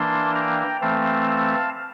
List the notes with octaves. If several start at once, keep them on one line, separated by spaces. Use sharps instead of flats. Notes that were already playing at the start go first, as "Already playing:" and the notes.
Already playing: E3 A#3 D4 A5 C6
G5 A#5
E3 A3 C4 F5 A5
F5 A5